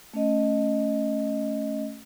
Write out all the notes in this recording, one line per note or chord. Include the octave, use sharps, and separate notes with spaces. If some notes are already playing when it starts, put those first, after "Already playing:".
A3 C#4 D#5